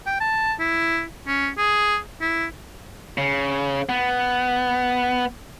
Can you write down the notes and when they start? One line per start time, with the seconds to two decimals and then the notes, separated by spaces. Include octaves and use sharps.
0.06 G5
0.21 A5
0.60 E4
1.27 C#4
1.58 G#4
2.21 E4
3.18 C#3
3.89 B3